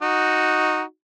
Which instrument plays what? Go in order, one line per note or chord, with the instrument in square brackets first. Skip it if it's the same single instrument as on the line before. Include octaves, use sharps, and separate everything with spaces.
[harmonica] D#4 F#4